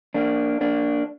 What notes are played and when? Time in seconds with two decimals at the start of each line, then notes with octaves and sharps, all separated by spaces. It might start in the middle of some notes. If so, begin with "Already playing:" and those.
0.14 A#3 D4
0.61 A#3 D4